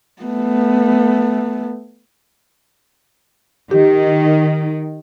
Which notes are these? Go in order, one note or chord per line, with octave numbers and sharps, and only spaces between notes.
A3 B3
D#3 G4